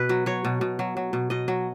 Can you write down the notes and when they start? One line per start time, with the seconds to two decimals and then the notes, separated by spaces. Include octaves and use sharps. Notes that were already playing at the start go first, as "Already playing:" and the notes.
Already playing: B2 B4
0.09 F#3
0.26 F#3 C#5
0.45 B2
0.61 B2
0.79 F#3
0.97 F#3
1.13 B2
1.30 B2 D#5
1.48 F#3